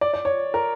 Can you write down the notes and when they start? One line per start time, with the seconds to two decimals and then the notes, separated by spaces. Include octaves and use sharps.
0.01 D5
0.14 D5
0.25 C#5
0.54 A#4